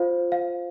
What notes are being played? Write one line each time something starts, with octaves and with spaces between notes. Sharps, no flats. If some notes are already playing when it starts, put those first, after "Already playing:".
Already playing: F4 C5 F5
F5